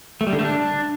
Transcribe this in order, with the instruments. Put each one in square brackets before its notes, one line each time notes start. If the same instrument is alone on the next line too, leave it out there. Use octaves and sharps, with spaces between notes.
[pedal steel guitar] A3
G3
D3
A3
D4